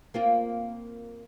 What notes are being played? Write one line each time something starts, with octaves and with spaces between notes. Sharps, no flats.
A#3 C4 F4